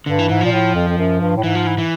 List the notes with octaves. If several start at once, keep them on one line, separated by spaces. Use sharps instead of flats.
G2 D3
E3
G#2 E3
A#2 F3
A2
F2
F2
F#2
G2
A2
G#2 E3
F3
E3
E3